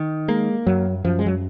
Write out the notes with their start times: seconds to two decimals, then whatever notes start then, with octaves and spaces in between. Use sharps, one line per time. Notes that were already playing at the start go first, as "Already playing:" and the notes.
Already playing: D#3
0.28 G#3 A#3
0.66 F#2 F#3
1.04 F#2 F3
1.19 G#3
1.26 F#3